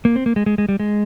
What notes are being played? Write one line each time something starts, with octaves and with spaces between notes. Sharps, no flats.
A#3
C4
A#3
G#3
G#3
G#3
G3
G#3